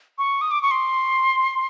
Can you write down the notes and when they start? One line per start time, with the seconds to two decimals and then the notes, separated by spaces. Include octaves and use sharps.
0.18 C#6
0.41 D#6
0.51 D6
0.62 C#6
0.71 C6